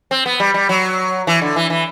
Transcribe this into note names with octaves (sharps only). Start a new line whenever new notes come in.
C4
B3
G3
G3
F#3
E3
D3
E3
E3